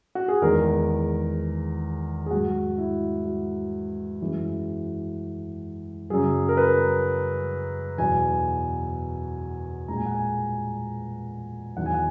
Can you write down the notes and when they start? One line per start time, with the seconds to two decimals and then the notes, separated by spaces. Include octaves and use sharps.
0.15 F#4
0.28 G#4
0.42 E2 D#3 G#3 A#4
2.26 G#4
2.31 G#2 F#3 F#4
2.78 E4
3.25 F#4
4.21 F#2 E3 G#3
6.10 F#2 C#3 F#3 G#4
6.49 A#4
6.57 B4
7.98 E2 B2 F#3 G#5
9.88 A#2 G#3 A#5
9.97 G#5
10.06 F#5
10.15 G#5
11.77 E2 D#3 F#3 F#5
11.86 G#5
11.94 F#5